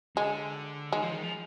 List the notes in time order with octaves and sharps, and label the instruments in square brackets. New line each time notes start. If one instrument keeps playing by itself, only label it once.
[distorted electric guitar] D3 [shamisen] G#3
[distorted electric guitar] D#3 [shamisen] G#3
[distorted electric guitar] F3
D#3
F3